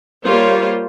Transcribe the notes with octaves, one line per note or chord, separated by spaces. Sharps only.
G3 A#3 F4 C5 C#5